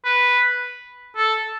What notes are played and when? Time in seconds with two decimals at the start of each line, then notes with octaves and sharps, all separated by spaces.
0.05 B4
1.17 A4